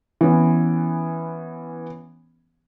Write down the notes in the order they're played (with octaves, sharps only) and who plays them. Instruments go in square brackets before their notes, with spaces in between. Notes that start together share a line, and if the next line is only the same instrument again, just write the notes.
[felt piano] E3 B3 C#4